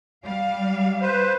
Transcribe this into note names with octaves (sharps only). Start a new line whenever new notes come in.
G3 F5
B4 C5